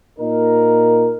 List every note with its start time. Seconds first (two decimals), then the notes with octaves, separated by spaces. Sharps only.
0.19 A#2 A#3 D#4 A#4